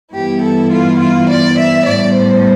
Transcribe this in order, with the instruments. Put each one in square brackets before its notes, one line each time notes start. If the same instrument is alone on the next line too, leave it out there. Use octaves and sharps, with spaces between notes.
[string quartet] G2 E3 B3 E4 G4
A4
F4
F4
D5
E5
A2 G3 B3 D5
C5